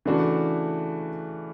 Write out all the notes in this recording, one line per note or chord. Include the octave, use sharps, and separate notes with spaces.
C#3 E3 A3 D4 F#4